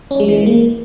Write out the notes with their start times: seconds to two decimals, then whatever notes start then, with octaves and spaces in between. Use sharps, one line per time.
0.11 C#4
0.20 G#3
0.29 E3
0.37 G#3
0.46 A#3